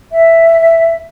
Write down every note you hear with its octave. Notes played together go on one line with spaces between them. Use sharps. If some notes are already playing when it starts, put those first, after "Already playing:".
E5